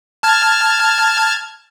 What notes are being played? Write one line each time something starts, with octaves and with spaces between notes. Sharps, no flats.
A5 F6 G#6